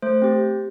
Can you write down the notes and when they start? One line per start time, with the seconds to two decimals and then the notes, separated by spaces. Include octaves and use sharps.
0.02 A3 C5
0.22 C4 G4